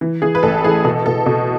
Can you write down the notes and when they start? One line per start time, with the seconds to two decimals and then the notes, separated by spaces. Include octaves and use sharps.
0.01 E3
0.22 E3 G#4
0.35 B4
0.43 A1 A4
0.64 E3 G#4
0.84 B2 A4
1.06 B2 A4
1.26 B2